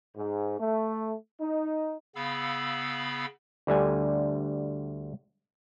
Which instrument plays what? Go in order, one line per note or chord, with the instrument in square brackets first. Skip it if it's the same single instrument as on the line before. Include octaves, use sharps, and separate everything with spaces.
[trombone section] G#2
A3
D#4
[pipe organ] C#3 B3 F5 B5 E6
[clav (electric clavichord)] D2 D3 G3 G#5